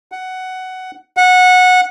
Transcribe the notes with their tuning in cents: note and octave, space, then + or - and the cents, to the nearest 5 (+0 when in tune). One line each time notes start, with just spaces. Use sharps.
F#5 +10
F#5 -15